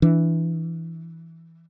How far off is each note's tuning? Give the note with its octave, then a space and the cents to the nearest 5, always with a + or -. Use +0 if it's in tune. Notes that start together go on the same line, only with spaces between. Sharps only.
E3 +0 D4 +0